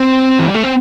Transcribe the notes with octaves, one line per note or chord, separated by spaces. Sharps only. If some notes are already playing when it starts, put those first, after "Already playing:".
Already playing: C4
E3
G3
A3
C4